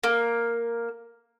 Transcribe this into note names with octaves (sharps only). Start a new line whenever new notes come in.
A#3